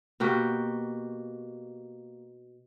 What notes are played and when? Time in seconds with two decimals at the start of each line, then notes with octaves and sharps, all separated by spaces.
0.20 B2 A#3 F#4 G4